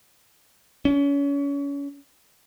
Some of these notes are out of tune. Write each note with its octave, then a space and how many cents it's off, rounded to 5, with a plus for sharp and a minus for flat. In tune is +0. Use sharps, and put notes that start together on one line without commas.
C#4 +30